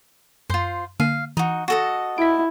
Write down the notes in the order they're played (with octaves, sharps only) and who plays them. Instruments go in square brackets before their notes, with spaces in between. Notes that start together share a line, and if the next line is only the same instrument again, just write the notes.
[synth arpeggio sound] F#2 G6 [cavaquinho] F4 C5
[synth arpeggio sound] D3 A#3 D#7 [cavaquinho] F5
[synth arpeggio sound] E3 [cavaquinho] D#4 F#4
[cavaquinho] F#4 A4 D#5
[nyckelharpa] E4 [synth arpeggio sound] B6 D7